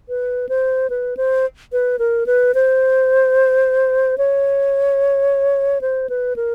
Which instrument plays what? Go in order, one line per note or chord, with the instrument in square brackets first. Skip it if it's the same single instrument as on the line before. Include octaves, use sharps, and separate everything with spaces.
[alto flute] B4
C5
B4
C5
B4
A#4
B4
C5
C#5
C5
B4
A#4